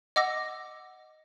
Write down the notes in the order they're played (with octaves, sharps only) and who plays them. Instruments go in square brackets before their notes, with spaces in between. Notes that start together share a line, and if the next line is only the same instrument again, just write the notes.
[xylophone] D#5 F#5 D6 E6 A#6